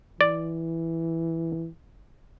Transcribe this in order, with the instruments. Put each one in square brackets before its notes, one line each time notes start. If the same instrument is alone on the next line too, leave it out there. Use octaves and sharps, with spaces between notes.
[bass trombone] E3 [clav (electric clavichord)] D5